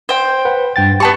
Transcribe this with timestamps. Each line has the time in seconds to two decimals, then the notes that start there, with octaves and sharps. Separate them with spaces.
0.09 C5 G5
0.45 B4 F#5
0.76 G2 G5 A6
1.00 B3 G4 A5 C#6